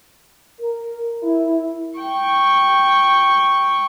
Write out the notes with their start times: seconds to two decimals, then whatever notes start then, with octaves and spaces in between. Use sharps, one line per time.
0.59 A#4
1.23 E4
1.99 G5 C#6